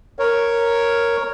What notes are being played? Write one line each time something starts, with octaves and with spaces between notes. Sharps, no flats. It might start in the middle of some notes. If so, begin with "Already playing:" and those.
A#4 C#5